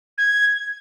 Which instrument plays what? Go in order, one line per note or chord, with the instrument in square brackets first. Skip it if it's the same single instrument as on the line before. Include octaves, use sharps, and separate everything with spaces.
[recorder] G#6